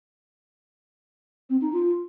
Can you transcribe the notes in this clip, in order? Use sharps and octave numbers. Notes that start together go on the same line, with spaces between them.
C4
D#4
F4